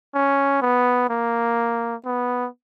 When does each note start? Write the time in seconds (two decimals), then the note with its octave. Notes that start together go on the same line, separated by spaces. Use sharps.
0.15 C#4
0.62 B3
1.10 A#3
2.05 B3